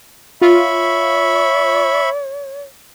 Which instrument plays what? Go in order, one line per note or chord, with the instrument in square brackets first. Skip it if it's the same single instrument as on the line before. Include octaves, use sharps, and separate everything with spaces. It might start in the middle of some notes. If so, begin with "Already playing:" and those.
[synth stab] F4 [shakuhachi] C#5 [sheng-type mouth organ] E5 B5 C#6